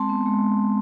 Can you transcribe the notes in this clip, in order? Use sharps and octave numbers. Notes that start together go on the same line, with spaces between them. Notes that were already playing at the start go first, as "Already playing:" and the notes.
Already playing: G#3 C4 A5 C6
B3
G#3